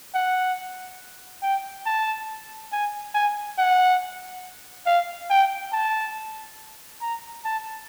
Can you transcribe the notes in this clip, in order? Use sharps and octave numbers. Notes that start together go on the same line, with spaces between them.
F#5
G5
A5
G#5
G#5
F#5
F5
G5
A5
A#5
A5